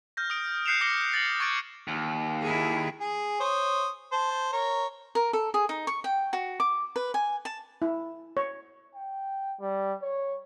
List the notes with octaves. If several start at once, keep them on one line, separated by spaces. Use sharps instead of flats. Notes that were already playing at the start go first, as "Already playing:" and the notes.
F6 G6 A#6
D#6 D7
F#6 G6 C7 C#7 E7 F7
D6 A#6 C7 C#7 G7
A6 A#6 C#7 F#7
C#6 F#6 G#6 A6 D7
D#2
E4 G#4
G#4
C5 C#5 D#6
C5 A5
A#4 C#5
A#4
A4
G#4
D#4
C#6
G5
F#4
D6
B4
G#5
A5
E4
C#5
G5
G3
C#5